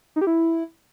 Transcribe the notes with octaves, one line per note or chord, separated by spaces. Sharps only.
D#4
G4
E4